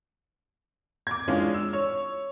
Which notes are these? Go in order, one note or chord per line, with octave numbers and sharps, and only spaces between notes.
D6 G#6
E3 G#3 C#4 D4 F4
E6
C#5